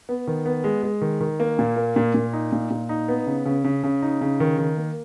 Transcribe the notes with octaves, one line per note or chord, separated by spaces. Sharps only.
B3
D#3
B3
G#3
G#3
D#3
D#3
A#3
A#2
A#3
A#2
A#2
D#4
A#2
A#2
D#4
B3
C#3
C#3
C#3
C#3
D#4
C#3
D#3
D#3
A#3